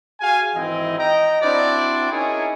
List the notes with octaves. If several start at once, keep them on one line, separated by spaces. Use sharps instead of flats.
F#4 G#4 F5 G#5
G#1 E3 C4 E4 D#5
D#5 G5 A#5
C4 D4 E4 F#4 C5 D5
C#4 D#4 E4 G#4 A#4 C#5